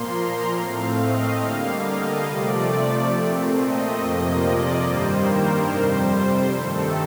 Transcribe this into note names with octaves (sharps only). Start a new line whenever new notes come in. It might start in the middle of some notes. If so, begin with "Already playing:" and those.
Already playing: A#2 F3 A#3 C6
A#5
A2 A3 C4 F5
D#5
D3 G3 A#3 F5
D#5
C3 F3 A3 D5
A#2 A3 C4
D#5
F2 C3 F3 A#3
D5
G2 D#3 G3 A#3 C5
A#4
F2 C3 G3 C5
G2 D#3 A3 C4 A4